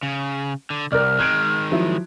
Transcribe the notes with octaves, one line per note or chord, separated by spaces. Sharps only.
C#3
D3
C2 A#4 D5 F6
D#3 G#3 F#6 G#6 D7
F3 F#3 E4